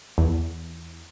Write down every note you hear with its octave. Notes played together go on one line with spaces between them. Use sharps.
E2